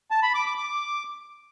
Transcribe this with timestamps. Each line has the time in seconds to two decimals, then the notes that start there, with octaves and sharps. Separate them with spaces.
0.11 A5
0.22 B5
0.34 D6
0.46 D6
0.58 D6